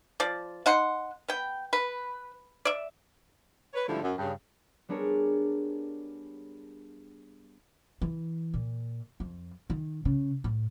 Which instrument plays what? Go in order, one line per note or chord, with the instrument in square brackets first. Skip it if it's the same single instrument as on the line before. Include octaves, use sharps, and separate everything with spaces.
[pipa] F3 D5
D#4 F#5 C6
B3 G5
B4
D5 E5
[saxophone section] B4 C#5
G#2 D3 F3 G3 A3 E4
F#2
G2 C#3
[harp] G3 B3 D4 G#4 A#4 C#5
[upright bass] E3
A#2
F2
D#3
C#3
A2